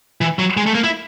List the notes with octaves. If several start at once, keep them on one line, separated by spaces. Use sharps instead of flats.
E3
F#3
G#3
A3
A#3
E4